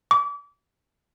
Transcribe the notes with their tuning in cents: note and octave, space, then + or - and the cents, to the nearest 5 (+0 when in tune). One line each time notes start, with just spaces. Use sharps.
D6 -35